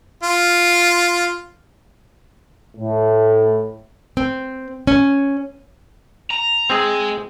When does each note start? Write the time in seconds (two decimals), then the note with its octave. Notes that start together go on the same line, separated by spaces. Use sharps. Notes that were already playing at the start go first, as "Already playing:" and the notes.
0.23 F4
2.76 A2
4.17 C4
4.87 C#4
6.31 A#5
6.70 G#3 C4 G#4